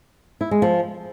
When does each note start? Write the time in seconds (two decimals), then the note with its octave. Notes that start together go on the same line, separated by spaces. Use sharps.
0.41 E4
0.51 G#3
0.62 F3